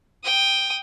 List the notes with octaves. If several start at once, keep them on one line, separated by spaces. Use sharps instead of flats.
G5 D#6